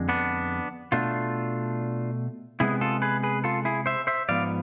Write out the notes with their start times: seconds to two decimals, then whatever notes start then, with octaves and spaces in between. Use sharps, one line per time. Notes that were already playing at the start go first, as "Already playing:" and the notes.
Already playing: F2 D3 G#3
0.09 B3 D4
0.92 B2 A3 D4 F4
2.60 C3 G#3 B3 E4 G#4
2.81 F4 A4
3.02 G#4 B4
3.23 G#4 B4
3.44 F4 A4
3.65 E4 G#4
3.86 C5 E5
4.07 C5 E5
4.29 G#2 F3 B3 D5 F5